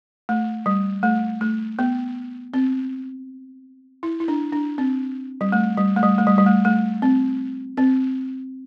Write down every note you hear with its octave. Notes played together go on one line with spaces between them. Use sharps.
A3
G3
A3
A3
B3
C4
E4
E4
D4
D4
C4
G3
A3
G3
A3
G3
A3
G3
G3
A3
A3
C4
C4